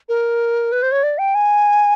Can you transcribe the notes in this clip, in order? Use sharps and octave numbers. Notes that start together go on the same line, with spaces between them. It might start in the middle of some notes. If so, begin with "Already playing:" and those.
A#4
B4
C5
C#5
D5
G5
G#5